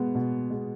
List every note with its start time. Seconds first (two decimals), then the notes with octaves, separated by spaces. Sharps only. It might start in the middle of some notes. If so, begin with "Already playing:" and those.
Already playing: B2 G#3 B3
0.15 B2
0.50 G#3 B3